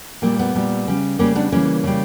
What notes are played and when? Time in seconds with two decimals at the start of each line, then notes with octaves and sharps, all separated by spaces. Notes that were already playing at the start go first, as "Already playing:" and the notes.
0.22 A#2 G3 A#3
0.39 B3
0.55 A#2 G3
0.88 C#3 G3
1.19 C#3 G3 A#3 C#4
1.35 B3 D4
1.52 C#3 E3 G3 A#3 C#4
1.84 C#3 G3